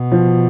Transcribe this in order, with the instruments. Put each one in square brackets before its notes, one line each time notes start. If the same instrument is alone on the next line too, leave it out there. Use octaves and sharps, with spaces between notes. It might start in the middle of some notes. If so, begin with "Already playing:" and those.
Already playing: [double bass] B2
[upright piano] F3